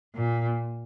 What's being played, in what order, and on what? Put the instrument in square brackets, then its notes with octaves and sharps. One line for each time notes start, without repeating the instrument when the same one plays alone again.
[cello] A#2